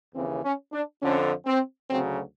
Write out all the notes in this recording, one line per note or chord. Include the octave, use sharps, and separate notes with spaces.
D#2 C#3 E3 C4
C#4
D4
F2 D3 F3 C#4
C4
D2 C#3 F#3 C4